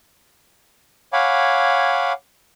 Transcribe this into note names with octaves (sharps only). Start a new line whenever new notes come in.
C#5 F5 F#5 G#5 B5 D6